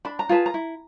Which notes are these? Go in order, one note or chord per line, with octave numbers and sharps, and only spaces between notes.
D4 B5
A#5
F4 G#4 B4 A5
A#5
E4